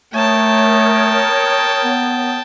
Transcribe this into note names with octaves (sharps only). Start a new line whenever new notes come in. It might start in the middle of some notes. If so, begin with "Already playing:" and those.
A3 A#4 C#5 G5 A5 D#6
B3